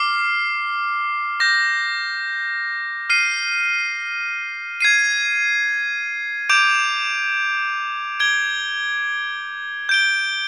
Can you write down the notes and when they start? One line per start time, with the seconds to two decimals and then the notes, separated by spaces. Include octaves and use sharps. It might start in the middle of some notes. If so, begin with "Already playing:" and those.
Already playing: D6 F6 C7
1.40 D6 G6 A#6
3.10 F6 C7 D#7
4.81 G#6 C7 D#7
6.49 D6 G6 D7 F7
8.20 G#6 D7 G7
9.89 G6 D7 G7